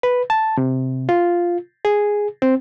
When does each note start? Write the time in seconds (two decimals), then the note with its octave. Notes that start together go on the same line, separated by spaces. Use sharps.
0.03 B4
0.30 A5
0.57 C3
1.09 F4
1.85 G#4
2.42 C4